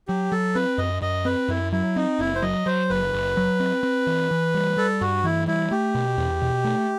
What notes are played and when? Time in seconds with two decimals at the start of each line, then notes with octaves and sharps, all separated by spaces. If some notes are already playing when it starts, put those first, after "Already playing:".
0.08 F#3 G4
0.32 F#3 A4
0.55 C4 B4
0.78 F#2 D#5
1.02 F#2 D#5
1.25 C4 B4
1.48 F#2 E4
1.72 F#3 E4
1.96 C4 D#4
2.19 F#1 E4
2.35 C5
2.42 F#3 D#5
2.66 F#3 C5
2.90 F#1 B4
3.13 F#1
3.37 F#3
3.60 C4
3.83 C4
4.07 E3
4.31 E3
4.54 G3
4.77 G3 A4
5.01 G2 F#4
5.24 E3 E4
5.48 G3 E4
5.71 A3 G4
5.95 B2
6.18 E2
6.42 B2
6.64 A3